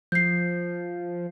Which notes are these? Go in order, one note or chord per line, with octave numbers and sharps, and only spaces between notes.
F3 G6 C7